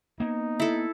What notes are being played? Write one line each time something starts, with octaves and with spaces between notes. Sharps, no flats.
A#3 B3 D#4
E4 A4